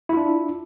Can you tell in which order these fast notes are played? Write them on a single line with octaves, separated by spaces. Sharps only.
E4 F4 D4